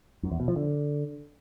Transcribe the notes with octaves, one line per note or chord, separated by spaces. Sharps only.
F#2
E2
B2
F3
D3